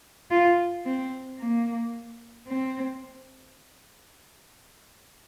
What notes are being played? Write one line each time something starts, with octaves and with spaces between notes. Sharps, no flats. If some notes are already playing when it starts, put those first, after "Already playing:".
F4
C4
A#3
C4